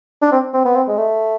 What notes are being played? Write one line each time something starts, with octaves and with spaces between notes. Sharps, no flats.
D4
C4
C4
B3
C4
G#3
A3